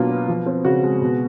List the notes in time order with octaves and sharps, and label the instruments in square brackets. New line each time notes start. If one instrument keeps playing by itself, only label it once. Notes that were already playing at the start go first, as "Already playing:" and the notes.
Already playing: [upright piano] B2 F#3 A#3 D4 F4
B3
F3
C4
C#3 F#4
G#3
B2